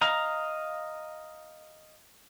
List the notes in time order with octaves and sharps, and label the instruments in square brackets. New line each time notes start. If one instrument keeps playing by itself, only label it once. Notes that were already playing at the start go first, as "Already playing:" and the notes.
[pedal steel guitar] D#5 F5 A#5